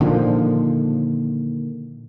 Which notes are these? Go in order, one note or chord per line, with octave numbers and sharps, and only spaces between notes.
A#2 D3 D#3 F3